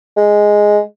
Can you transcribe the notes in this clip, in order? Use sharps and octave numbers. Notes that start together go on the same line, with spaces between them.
G#3